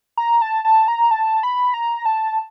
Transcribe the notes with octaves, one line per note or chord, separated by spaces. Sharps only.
A#5
A5
A5
A#5
A5
B5
A#5
A5